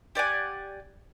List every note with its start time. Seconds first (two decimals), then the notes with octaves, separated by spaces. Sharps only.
0.15 G4 D5 F#5 G#5